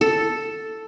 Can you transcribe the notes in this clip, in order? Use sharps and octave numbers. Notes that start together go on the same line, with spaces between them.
A4